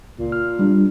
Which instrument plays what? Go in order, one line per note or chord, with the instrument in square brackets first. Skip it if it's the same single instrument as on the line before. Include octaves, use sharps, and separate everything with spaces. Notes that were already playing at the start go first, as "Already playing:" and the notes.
[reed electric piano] C#2 [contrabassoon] A#2
[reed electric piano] F6
G3 D4